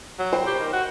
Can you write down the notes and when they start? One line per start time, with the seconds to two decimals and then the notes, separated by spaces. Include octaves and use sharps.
0.19 F#3
0.33 C5 G5 B5
0.47 G4
0.60 D#3
0.73 F#4